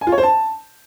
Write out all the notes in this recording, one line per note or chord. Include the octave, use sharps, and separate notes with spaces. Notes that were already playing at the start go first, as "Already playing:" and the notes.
G#5
F4
C#5
C5
A5